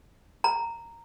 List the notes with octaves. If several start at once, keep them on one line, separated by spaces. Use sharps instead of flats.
A#5